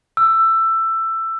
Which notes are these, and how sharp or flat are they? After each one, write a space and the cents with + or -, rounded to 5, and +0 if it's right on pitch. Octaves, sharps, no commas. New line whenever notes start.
E6 +15